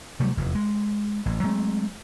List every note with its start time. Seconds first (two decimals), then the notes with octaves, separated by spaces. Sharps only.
0.20 C3 F#3 G3 A3
0.37 F1 E2
0.55 G#3
1.26 A1
1.43 F#3 G#3 A3 C4